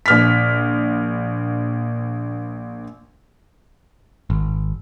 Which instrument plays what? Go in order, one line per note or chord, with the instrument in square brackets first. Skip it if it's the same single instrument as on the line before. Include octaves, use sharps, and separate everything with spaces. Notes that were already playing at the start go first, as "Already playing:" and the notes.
[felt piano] A#1 F6 B6
[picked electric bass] G#1